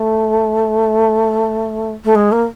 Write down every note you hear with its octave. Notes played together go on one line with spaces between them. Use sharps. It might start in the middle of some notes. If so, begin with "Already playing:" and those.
Already playing: A3
A3
G#3
A#3